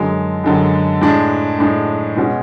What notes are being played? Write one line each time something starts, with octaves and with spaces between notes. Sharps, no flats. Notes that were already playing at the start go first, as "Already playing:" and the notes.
Already playing: F#2 D3 G#3
F#2 D3 G#3
A2 G#3 D4
A2 G#3 D4
B2 G#3 C#4